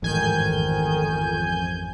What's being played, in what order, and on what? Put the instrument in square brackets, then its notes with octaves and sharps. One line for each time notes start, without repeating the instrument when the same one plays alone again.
[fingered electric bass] A1 G#2 [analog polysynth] F2 G#5 G6 [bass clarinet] D#3